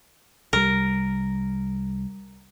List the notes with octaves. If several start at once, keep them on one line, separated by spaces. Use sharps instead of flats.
C2 G3 A#4